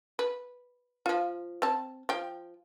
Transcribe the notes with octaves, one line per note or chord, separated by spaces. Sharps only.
B4
F3 F4
C4 A5
F3 G5